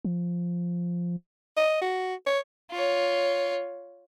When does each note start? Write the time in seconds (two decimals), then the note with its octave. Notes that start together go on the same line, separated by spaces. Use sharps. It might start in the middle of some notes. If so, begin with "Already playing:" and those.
0.05 F3
1.57 D#5
1.81 F#4
2.27 C#5
2.71 F4 C#5